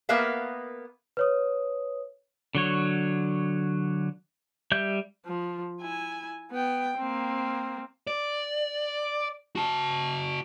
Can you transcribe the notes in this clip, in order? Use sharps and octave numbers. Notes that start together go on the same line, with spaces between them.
A#3 B3 A#4 B4 E5 F5
B4 C#5 D#6
D3 F#3 C#5
G3 E5 G6
F3
E4 G#5
B3 G5
A#3 C4
D5
F#4 A5